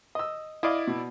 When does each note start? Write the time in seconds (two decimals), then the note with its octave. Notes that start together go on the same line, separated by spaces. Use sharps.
0.15 D#5 E6
0.63 E4 D5 D#5 F5 D6
0.87 B2